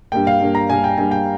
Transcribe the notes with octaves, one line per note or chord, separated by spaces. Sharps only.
G2 G3 A#3 G5
F5
G2 G3 A#3
A#5
G2 G3 A#3 G#5
G5
G2 G3 A#3 G#5
G5